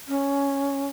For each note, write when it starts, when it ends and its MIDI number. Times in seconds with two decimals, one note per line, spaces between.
0.08 0.87 61